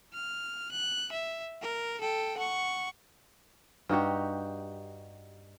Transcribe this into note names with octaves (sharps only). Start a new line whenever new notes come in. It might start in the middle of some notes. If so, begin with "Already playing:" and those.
F6
F#6
E5
A#4
A4 G5
F#5 C#6
G2 D#4 F#4 G4